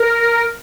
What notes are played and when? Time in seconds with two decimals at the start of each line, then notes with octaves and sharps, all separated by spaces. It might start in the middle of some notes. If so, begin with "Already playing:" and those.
Already playing: A#4